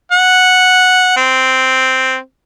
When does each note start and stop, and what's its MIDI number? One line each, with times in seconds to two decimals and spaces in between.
0.12 1.13 78
1.17 2.17 60